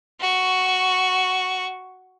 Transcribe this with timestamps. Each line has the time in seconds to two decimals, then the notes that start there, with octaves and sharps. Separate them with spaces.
0.20 F#4 C#6